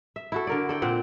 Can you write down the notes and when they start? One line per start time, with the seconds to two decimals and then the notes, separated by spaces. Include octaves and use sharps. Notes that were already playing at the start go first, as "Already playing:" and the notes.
0.16 E5
0.32 E4 F#4 A4
0.47 D3 A#4 D5
0.69 A4 D5 G5
0.82 A#2 C4 F#5